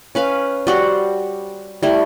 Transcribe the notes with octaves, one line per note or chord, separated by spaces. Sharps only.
C#4 B4 F5
G3 F#4 C5
G3 A3 E4